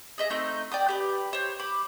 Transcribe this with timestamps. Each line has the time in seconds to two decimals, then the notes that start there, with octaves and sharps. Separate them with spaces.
0.18 G#4 D#5 E5
0.30 A3 C4 D#4 G6
0.72 D5 G5 D#6
0.89 G4 B4
1.33 C5 C#5
1.59 B5 D6